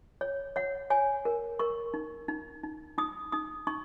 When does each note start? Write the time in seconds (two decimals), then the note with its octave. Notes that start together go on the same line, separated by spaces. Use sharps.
0.21 C#5
0.56 C#5 F#5
0.90 C#5 G#5
1.25 A#4
1.59 A#4 C#6
1.94 D#4
2.28 D#4
2.63 D#4
2.98 D#4 D#6
3.32 D#4 D#6
3.67 D#4 C#6